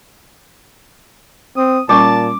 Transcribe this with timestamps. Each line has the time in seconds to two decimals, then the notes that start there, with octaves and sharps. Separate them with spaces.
1.57 C4 D#6
1.89 A#2 G3 C#4 A5 C#6 D6